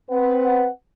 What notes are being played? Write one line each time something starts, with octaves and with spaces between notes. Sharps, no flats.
C4 B4 F#5